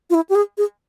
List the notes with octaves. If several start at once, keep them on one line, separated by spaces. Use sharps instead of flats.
F4
E4
G4
G#4
G#4